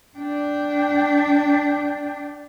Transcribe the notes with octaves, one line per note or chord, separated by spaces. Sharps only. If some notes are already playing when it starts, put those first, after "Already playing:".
D4 G5